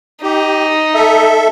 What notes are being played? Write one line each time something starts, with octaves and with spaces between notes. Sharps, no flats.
D#4 G4
A4 E5